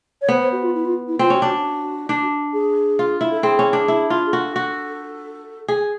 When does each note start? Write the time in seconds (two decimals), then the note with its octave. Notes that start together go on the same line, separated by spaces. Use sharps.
0.21 C#5
0.29 B3 C5
0.40 C5
0.52 F#4
0.63 F4
0.75 E4
0.85 F4
1.07 E4
1.19 C4 F4
1.30 C#4 F#4
1.42 D4
1.49 F#4
2.09 D4
2.53 G#4
2.99 F4
3.21 E4
3.32 A4
3.43 C4 G#4
3.59 C#4
3.73 D4
3.88 E4
4.10 F4
4.26 G#4
4.33 F#4 A4
4.56 F#4
5.68 G#4